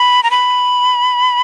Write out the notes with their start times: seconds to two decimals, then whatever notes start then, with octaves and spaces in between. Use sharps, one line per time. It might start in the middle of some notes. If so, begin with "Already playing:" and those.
Already playing: B5
0.23 A#5
0.31 B5